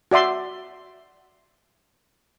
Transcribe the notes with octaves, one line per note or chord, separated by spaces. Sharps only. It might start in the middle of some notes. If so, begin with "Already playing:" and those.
F#4 D5 E5 C6